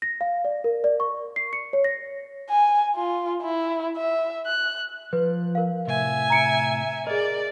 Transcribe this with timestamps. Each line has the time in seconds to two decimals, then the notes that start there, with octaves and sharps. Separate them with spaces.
0.02 A#6
0.21 F5
0.45 D5
0.64 A#4
0.84 D5
1.00 C#6
1.36 C7
1.53 C#7
1.73 C#5
1.84 A#6
2.50 G#5
2.96 F4
3.42 E4
3.96 E5
4.47 F#6
5.13 F3 B4
5.55 A#4 F5
5.87 A2 C3 E5 G#5
6.30 A#5 C#7 D7
7.07 G#4 A#4 D5 D#5